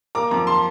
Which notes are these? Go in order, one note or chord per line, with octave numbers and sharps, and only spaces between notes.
A#3 A#5 D6
F2 A#5 D6
A5 C6